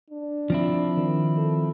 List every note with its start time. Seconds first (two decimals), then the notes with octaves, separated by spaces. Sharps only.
0.10 D4
0.50 F3 C4 E4
0.97 D#3
1.37 A4